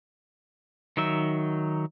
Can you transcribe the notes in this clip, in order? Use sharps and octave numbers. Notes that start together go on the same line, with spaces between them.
D#3 F#3 D#4 E5